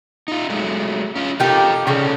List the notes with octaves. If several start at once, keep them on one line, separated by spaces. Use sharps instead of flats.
D#4 F4
F#3 G#3 A3
C#4 F4
D#4 F4 G4 A4 A#4
C#3 G3 C#4 A4